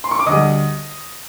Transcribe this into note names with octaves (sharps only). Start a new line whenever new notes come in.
C6
C#6
D6
D2 D3 G3 D#5 D#6